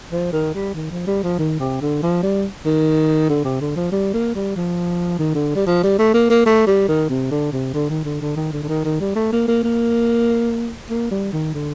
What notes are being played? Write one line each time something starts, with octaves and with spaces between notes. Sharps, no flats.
F3
D#3
G3
D#3
F3
G3
F3
D#3
C3
D3
F3
G3
D#3
D3
C3
D3
F3
G3
A#3
G3
F3
D#3
D3
G3
F3
G3
A3
A#3
A#3
A3
G3
D#3
C3
D3
C3
D3
D#3
D3
D3
D#3
D3
D3
D#3
D#3
G3
A3
A#3
A#3
A#3
A#3
G3
D#3
D3